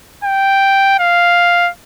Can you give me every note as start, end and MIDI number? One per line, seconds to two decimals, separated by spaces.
0.24 0.96 79
1.00 1.70 77